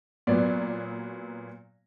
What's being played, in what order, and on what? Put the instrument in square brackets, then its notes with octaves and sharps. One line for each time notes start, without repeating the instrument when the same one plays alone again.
[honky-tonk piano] A#2 F#3 B3 [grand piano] D5